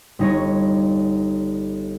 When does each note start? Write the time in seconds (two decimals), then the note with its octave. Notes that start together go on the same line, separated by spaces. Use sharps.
0.19 G1 D#4 C#5